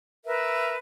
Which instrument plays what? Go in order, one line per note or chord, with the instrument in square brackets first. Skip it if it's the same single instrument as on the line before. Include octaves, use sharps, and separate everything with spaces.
[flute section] A#4 B4 E5